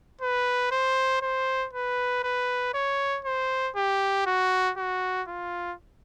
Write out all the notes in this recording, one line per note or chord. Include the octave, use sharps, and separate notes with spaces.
B4
C5
C5
B4
B4
C#5
C5
G4
F#4
F#4
F4